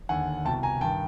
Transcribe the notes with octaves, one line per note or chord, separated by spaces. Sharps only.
D#2 D3 F#5 G#5
C2 B2 G5 A5
G#5 A#5
G2 D#3 G5 A5